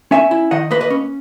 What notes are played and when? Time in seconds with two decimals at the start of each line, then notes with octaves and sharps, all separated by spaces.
0.11 C#4 E5 G#5
0.31 E4
0.51 D#3 D#5 F#5
0.71 A#3 B4 D#5
0.81 B4 D#5
0.90 C#4